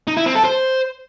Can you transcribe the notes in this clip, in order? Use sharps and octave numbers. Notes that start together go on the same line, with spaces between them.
D#4
E4
C4
A4
C5